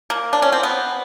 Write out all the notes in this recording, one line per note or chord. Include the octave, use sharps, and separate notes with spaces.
A#3
D4
C#4
C4
B3